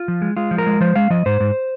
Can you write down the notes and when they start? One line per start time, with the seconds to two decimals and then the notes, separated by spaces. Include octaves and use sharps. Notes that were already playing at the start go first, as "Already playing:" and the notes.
Already playing: F4
0.08 F3
0.22 G#3
0.37 G#3 F4
0.51 F3
0.58 A#4
0.67 G#3
0.80 F3 C5
0.96 G#3 F5
1.10 F3 D#5
1.26 G#2 C5
1.40 G#2